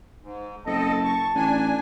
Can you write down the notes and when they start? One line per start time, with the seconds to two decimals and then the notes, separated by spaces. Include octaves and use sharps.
0.22 G#2
0.66 F#1 C4 A4 D#5 A5
1.05 C#6
1.36 A1 D4 G#5